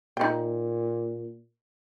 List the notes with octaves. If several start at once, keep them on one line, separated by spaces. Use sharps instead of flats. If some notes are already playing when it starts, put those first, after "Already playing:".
A#2 D#4 G5